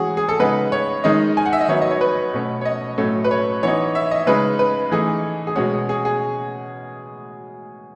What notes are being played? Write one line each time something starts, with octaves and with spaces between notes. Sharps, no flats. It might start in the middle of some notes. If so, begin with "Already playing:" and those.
Already playing: E3 G#3 C#4 F#4 G#4
G#4
A4
C#3 G#3 B3 D#4 B4
C#5
D#3 G#3 D#4 D#5
G#5
F#5
E5
D#5
D#3 F#3 B3 D#4 C#5
D#5
C#5
B4
B2 A3 C#4
C#5
D#5
A2 F#3 A3 C#4
B4
C#5
E3 B3 D#4 C#5
E5
D#5
C#3 G#3 D#4 B4
B4
E3 A3 D#4 G#4
G#4
B2 G#3 C#4 F#4
G#4
G#4
G#4